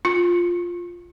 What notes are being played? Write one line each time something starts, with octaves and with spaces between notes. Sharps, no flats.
F4